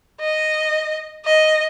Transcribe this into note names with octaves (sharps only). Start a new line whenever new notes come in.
D#5
D#5